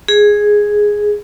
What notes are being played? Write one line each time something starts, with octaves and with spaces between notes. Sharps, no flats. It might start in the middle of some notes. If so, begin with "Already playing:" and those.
G#4